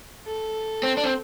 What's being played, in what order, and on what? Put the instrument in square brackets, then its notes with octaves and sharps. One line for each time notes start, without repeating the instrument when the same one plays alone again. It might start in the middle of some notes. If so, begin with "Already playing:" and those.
[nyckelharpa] A4
[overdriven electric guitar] C4
D4
C4